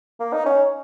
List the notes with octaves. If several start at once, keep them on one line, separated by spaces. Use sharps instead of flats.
A#3
D#4
C#4